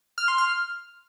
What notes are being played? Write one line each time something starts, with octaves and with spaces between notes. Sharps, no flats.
F6
C6
F6